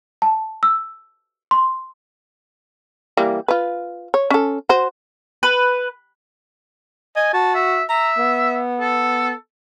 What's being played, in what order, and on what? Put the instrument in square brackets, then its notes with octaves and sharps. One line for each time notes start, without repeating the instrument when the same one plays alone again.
[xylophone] A5
E6
C6
[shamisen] E3 G3 A#3
F4 B4
C#5
C#4 A4
F#4 C5
[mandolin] B4
[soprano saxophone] D#5 [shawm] G#5
[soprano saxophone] F#4 [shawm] A5
[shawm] E5
[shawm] E5 [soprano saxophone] A#5
[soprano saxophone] B3
[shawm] A4